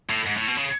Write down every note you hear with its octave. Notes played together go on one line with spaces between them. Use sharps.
A2
G#2
A2
B2
C#3